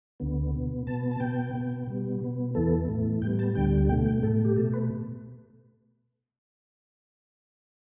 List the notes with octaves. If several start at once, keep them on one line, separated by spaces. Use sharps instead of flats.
D2 D3 B3
B2 B3
B2 B3 A5
A5
B2 B3 G5
B2 B3
B2 G3 B3
B2 B3
E2 E3 B3 A4
A2 E3 A3
A2 G3 B3 G5
A5
D2 D3 G3 G5
B2 A3 G5
G5
A2 A3 A4
G4
B2 A3 A4
B4